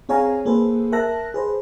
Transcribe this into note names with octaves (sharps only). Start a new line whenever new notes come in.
C4 G#4 C#5 F5 G#5 A#5
A#3 G#4 A4 B4 C5
A#4 E5 A5 F#6 A#6
G#4 B4 C5